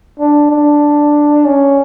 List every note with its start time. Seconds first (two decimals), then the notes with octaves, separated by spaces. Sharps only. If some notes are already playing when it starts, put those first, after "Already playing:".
0.19 D4
0.51 D4
1.46 C#4